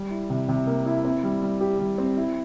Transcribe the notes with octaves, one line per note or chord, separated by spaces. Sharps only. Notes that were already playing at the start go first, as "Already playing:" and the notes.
Already playing: G3
E4
C3
C3
A#3
E4
C4
G3
G3
G4
G3
C4
E4